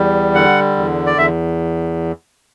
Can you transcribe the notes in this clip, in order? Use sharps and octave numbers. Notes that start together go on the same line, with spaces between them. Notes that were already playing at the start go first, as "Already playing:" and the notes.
Already playing: E2 G3
D3 F#5
E2
D5
E2 E5